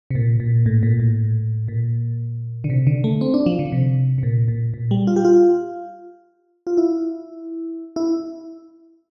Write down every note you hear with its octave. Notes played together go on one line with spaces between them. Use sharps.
C3
A#2
A#2
A2
A#2
A2
A#2
D3
C3
D3
A3
C4
D4
F3
D3
C3
C3
A#2
A#2
A#2
G3
F4
G4
F4
F4
E4
E4